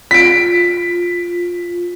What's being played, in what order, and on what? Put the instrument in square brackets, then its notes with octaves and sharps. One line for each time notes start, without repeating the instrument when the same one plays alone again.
[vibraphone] F4 [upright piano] B6 D7